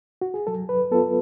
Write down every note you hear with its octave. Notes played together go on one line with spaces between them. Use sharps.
F#4
G#4
F#3 A4
B4
B3 F4 A4